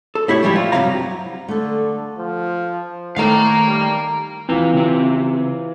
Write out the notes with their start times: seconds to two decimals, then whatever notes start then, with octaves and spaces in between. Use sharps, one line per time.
0.15 A4
0.28 A2 E4 G4 C#5
0.43 A2 F3 G3 G#3 E4 G4
0.56 F4
0.72 G2 C3 E3 F#3 F5 A#5
1.48 D3 A3 A4
2.18 F3
3.16 A2 D#3 A3 A#4 F5 A#5
3.67 G3
4.49 E3 C4 F4 A#5
4.74 C#3 C4